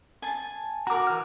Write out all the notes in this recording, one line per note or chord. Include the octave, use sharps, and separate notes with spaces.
G#5 A5
F#4 A#4 A#5 D6
E3 F6